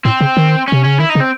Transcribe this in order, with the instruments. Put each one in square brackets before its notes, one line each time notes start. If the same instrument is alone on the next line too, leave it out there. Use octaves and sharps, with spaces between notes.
[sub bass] A2 [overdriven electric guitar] C4
[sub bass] C#3
D#3
[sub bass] C3 [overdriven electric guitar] C#4
[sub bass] C#3 [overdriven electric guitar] C#4
[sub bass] D#3 [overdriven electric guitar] E4
[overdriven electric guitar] D#4
[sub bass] C#3
[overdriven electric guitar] C4